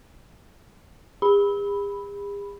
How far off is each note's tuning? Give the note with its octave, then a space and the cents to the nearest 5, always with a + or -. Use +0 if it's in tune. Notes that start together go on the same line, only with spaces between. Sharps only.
G#4 -45 B5 +0